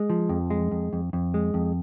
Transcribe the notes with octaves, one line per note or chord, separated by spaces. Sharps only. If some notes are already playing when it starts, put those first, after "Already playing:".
Already playing: G#3
F3
F2
G#3
F2
F2
F2
G#3
F2